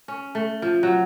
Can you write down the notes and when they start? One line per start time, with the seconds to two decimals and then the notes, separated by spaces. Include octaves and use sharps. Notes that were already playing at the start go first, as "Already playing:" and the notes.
0.08 C#4
0.35 A3
0.62 F3
0.83 F#3